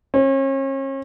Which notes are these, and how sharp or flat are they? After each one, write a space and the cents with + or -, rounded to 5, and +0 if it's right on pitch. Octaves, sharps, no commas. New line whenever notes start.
C#4 -40